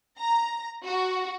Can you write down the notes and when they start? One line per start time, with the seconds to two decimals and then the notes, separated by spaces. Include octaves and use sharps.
0.18 A#5
0.84 F#4